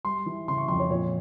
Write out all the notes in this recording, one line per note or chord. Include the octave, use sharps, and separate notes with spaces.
G3 C6
E3
C#3 C6
C#6
F2 C6
C#5
A#2 C#5